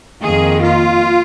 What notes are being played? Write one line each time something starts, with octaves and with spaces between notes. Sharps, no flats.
F2 D#3 A#3 G#4
F4